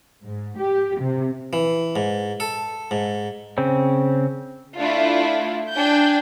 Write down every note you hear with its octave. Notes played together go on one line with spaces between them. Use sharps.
G#2
G4
C3
E3
G#2
A4
G#2
C#3 C4
A3 D4 E4 F4
D4 G5 G#5 G6